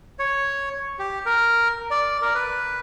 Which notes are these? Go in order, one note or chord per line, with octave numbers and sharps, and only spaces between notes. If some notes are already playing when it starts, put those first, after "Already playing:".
C#5
G4
A#4
D5
A#4
B4